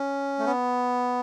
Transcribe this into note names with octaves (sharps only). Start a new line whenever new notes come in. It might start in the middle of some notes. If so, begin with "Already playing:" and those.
Already playing: C#4
A3
B3